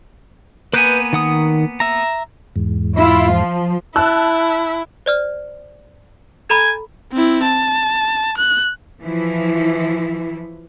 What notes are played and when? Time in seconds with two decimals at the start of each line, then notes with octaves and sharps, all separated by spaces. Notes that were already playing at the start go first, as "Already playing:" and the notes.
0.73 A#3 B3 B4 G#5 F#6 G6
1.13 D#3 F#5 D#6
1.80 E5 A#5
2.56 E2 G#2
2.97 E4 F4
3.31 F3
3.96 E4 A5 E6 F#6
5.06 C5 D5 F6
6.50 A4 G#5 A#5 B5
7.12 C4 E4
7.44 A5
8.38 F#6
9.02 E3 F3 E4